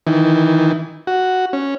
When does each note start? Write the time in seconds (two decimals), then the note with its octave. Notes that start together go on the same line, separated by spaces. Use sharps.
0.07 D#3 E3
1.07 F#4
1.53 C#4